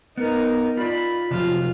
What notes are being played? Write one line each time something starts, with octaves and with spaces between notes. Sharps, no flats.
B3 D#4 A#4
F4 D5 B5
C3 F3 F#3 F4